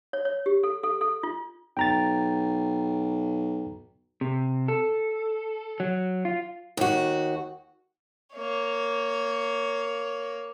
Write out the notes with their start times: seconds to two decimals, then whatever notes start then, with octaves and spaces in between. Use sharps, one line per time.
0.13 C#5
0.25 C#5
0.46 G4
0.63 A4
0.83 A4
1.01 A4
1.23 F4
1.77 B1 G5 A#5 A6
4.21 C3
4.68 A4
5.80 F#3
6.25 F4
6.77 D#2 F#4
8.35 A#3 C#5